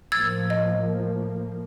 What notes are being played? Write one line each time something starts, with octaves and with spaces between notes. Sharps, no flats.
A2 F3 A#3 E6 G#6 A6
D#5